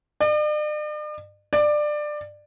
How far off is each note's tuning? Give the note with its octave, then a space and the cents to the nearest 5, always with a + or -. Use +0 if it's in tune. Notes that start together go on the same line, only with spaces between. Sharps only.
D5 +45
D5 +20